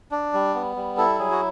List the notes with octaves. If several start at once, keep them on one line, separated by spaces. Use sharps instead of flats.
D4
G3
B3
G3
E4 A4
F#3 G#4
F#4